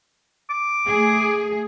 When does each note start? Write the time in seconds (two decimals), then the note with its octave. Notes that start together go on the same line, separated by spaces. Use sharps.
0.50 D6
0.87 A3 G#4